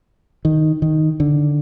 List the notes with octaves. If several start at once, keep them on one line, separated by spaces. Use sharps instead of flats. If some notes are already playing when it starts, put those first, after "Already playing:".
D#3
D#3
D3